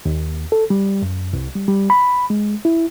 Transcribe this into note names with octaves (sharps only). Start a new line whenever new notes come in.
D#2
A4
G3
F#2
C2
G3
G3
B5
G#3
E4